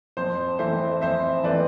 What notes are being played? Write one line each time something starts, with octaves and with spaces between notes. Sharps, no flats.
F2 C5
E3 A3 C4 C5 E5
F2 C5 E5
E3 A3 C4 B4 D5